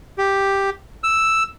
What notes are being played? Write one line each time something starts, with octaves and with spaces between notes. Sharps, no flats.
G4
E6